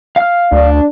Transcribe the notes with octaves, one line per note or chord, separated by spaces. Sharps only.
F5 F6
D2 D4